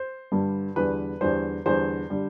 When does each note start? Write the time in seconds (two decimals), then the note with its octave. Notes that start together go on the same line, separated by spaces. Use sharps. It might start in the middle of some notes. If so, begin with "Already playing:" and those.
Already playing: C5
0.32 G2 D3 G3
0.76 E2 D3 G3 B4
1.21 E2 D3 G3 C5
1.66 E2 D3 G3 C5
2.10 D3 G3